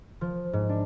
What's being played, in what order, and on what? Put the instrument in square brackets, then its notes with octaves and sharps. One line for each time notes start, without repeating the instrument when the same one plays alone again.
[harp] F3
G#2
D4